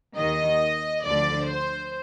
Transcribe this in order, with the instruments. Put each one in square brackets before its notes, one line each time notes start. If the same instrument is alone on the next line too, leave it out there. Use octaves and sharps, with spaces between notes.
[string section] D#2 D#3 D#5
D2 D3 F3 D5
C5